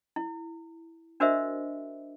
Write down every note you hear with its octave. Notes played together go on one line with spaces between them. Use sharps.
E4
D4 F#4 A#4 C5 D#5 E5